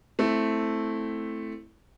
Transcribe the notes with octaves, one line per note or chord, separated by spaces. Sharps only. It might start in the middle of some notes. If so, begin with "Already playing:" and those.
A3 C4 E4